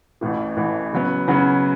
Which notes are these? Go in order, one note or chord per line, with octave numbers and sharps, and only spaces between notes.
A1 A2 E3
A1 A2 E3
C#3 F#3 B3
C#3 F#3 B3